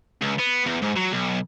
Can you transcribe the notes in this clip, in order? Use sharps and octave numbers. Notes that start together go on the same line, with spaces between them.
C#2
B3
E2
G#2
F#3
B1